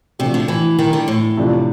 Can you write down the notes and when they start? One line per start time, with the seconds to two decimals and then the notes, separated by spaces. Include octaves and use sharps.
0.19 C3 F3 A3 D4 F#4
0.34 D3
0.48 E3
0.79 D#3
0.93 D3
1.08 A2
1.37 C3 F3 A3 D4